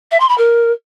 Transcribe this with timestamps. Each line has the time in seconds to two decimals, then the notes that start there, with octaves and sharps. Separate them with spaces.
0.11 E5
0.20 C6
0.29 B5
0.37 A#4